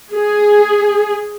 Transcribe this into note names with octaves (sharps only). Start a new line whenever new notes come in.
G#4